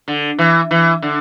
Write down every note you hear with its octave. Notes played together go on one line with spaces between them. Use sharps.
D3
E3
E3
D3